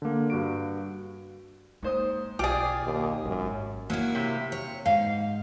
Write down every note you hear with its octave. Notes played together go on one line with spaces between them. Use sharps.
D3 A#3
G2 F#4 D7
G#2 A#3 C5 D#6
B1 F4 G4 G#4 D5
D#2
G#1 F#2
F#3 A#3 E4
C3
C#5
G#2 F5